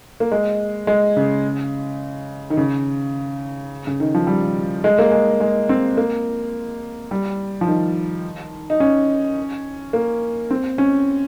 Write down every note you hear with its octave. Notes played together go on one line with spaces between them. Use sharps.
A#3
G#3
G#3
C#3
D#3
C#3
C#3
D#3
F3
G3
G#3
A#3
G#3
G#3
C4
A#3
G3
F3
D#3
D#4
C#4
A#3
C4
C#4